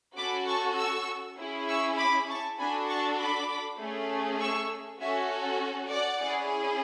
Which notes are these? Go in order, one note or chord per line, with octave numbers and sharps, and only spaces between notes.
C#4 F#4 A4 B5 D6
A5 C#6
C#6 E6
C#4 E4 G#4
C#6 E6
B5 D6
A5 C#6
D4 F#4 A4 G#5 B5
A5 C#6
B5 D6
A3 C#4 G#4
C#6 E6
C#4 F#4 A4 E5 G#5
D5 F#5
C#4 E4 G#4